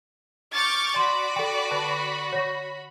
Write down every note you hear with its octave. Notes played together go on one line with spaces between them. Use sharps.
C#6 D6 F6 G6 A6
F#4 D5 B5 C6
A4 G5
D3 B4 A5
C#5 F#5 C#6 A#6